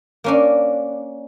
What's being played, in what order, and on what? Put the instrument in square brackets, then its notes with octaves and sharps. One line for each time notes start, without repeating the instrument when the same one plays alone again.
[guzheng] A#3 C#4 D4